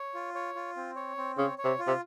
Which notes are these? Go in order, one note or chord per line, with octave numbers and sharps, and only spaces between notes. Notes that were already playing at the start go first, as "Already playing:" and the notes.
Already playing: C#5
F4
C#5
F4
C4
C#5
C4
C#3 C#5
C#5
C3
F4
C3